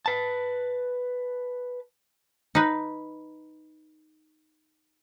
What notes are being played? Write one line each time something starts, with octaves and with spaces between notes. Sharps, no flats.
B4 A5
D#4 B4